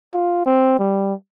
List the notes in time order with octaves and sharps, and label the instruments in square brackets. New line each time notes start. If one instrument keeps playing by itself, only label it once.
[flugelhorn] F4
C4
G3